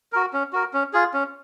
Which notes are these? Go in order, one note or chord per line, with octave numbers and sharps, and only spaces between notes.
F#4 A#4
C#4
F#4 A#4
C#4
F4 G#4
C#4